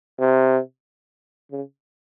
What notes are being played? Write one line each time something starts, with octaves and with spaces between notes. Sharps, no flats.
C3
C#3